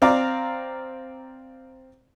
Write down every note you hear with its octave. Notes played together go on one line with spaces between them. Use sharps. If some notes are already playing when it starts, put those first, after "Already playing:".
C4 D5 F5 A#5